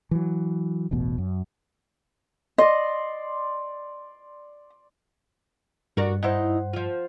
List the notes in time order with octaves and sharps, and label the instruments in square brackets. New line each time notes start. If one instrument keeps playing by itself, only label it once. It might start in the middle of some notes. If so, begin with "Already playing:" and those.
[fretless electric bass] E3 F#3
E1 A1 B2
F#2
[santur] D5 C6 [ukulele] D#5
[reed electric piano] G2 [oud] F#4 A#4 D5
[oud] D#4 E4 [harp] C5 F#5
[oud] F3 F4